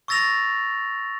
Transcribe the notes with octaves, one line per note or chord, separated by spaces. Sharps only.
C#6 E6 A6 A#6 F7